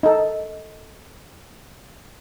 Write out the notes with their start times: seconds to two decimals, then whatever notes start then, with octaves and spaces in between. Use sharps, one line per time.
0.03 D#4 A4